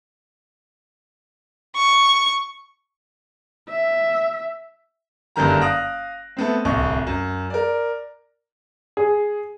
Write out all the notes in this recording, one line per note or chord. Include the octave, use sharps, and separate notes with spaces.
C#6
E5
F#1 G2 D3 D#3 A#5
F5 D#6 F#6 A#6 D7
A3 B3 C4
D1 C2 C#6
F#2
A#4 D5
G#4